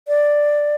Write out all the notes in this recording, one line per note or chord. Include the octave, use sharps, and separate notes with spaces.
D5